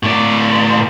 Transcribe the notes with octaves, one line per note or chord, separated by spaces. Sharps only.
A2 D5